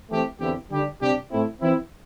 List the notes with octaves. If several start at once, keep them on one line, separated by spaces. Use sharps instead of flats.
E3 A3 C4 G4
E2 D3 C4 E4 G4
D3 G3 D4 G4
C3 G3 D4 G4
A2 A3 C4 E4
E3 C4 E4